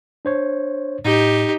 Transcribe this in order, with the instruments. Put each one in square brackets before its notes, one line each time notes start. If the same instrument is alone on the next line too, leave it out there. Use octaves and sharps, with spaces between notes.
[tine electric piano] D4 C5 C#5
[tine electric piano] A2 [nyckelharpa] D#4 G4